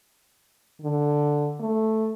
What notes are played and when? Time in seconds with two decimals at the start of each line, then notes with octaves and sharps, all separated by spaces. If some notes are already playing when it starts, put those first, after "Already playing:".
0.82 D3
1.60 A3